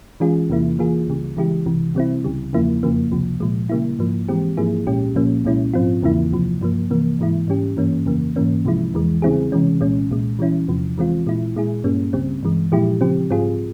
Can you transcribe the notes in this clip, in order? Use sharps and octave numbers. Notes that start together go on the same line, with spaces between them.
E3 G#3 C#4 F4 G#4
E2 C3 E3 A#3 E4
E3 A#3 F4 G#4
C#2 C#3 G3
C#3 E3 G#3 E4 G4
C2 C3 E3
C3 G3 C4 E4
C#2 C#3 G3
E2 C#3 F3 A#3 E4
F2 C#3 F3 A#3
C#2 C3 F3
A#2 F3 G#3
C#3 G3 A#3 E4
G#2 F3 A#3
E3 G#3 C4 G4
G#2 F3 A#3 E4 G#4
C2 A#2 G#3 C#4 G4
C2 A#2 F3 A#3 C#4
C2 A#2 G#3 C#4 E4
G#2 F3 C4 F4
E2 C#3 E3 A#3 E4
C#2 C3 F3
G2 F3 A#3
C3 E3 A#3
G#2 E3 G#3 E4
G#2 G3 C#4 G4
G2 E3 A#3 C#4
F2 C#3 E3 A#3
G#2 E3 A#3 C#4
C2 C3 F3 G#3 E4
E2 E3 G#3
C#3 G3 C4 E4 G#4
C3 E3 G#3 C#4
C2 A#2 G#3 C#4
C2 A#2 G#3
E3 G3 C#4 E4
E2 C3 F3
E3 G#3 C4 F4
A#2 G#3 E4
A#2 G#3 E4 G#4
G2 G3 A#3 C#4
C#2 C#3 G3 C4
G2 E3 G#3
A#2 F3 G#3 E4 G4
C#3 F3 C4 G4
G#2 G3 C4 F4 G#4